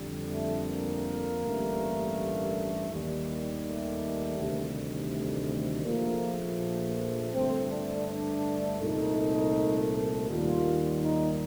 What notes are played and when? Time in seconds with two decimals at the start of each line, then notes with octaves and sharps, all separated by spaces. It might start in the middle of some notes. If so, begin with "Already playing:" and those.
Already playing: F2 D3 G3
0.30 A3
0.67 A#3
1.41 A1 G2 D3 A3
2.89 D#2 D#3 G3
3.63 A3
4.37 D2 C3 D#3 G3
5.11 A3
5.85 A#1 A#2 F3 A3 A#3
7.33 G2 D3 A3 C4
7.70 D4
8.07 D4
8.81 C2 A#2 A3 D#4
10.29 D#2 D#3 G3 F4
11.03 D#4